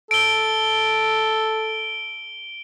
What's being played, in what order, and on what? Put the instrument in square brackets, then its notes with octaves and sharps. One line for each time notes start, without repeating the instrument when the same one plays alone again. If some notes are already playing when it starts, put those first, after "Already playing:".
[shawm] A4 [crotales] D7 G7